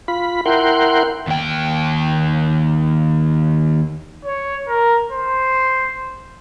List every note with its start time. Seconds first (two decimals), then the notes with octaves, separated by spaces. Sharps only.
0.08 F4 B5
0.46 E4 A#4 F#5 G5 C6
1.27 D#2 G5
4.25 C#5
4.68 A#4
5.12 C5